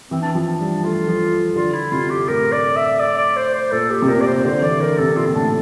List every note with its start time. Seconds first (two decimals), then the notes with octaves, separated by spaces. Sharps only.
0.11 E3 C4
0.22 D4
0.32 F3 C4
0.48 D4
0.60 G3
0.83 A3 F4
1.08 F3
1.56 D3 F4
1.74 E4
1.92 C3 F4
2.10 G4
2.28 A2 A#4
2.52 D5
2.76 E5
3.00 D5
3.18 D5
3.37 C5
3.55 C5
3.72 A#2 A4
3.91 G4
4.02 C3
4.08 A#2 A#4
4.21 D5
4.27 C5
4.45 D3 C5
4.62 E3 D5
4.80 D3 A#4
4.99 C3 A4
5.16 A#2 F4
5.26 C4
5.34 A2 D4